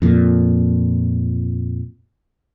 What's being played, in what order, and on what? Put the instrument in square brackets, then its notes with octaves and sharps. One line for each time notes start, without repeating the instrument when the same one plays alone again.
[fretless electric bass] F2 A#2